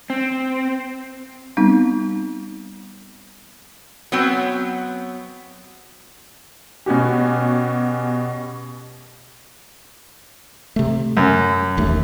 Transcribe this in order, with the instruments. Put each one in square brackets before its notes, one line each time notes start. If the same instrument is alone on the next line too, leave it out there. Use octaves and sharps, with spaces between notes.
[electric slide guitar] C4
[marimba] G3 B3 C4 D#4
[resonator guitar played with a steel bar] F#3 B3 C4 G5
[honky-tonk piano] B2 C#4 F#4 G4
[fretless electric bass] C3 A3
[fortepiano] F#2
[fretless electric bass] E1 D#2 A3